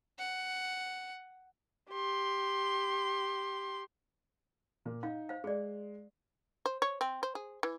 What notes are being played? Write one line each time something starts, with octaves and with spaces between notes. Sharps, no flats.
F#5
G4 C6
A#2
D#4 F5
C5 F5
G#3 G#4 D5
C5
C#5
C4
C5
G#4
E3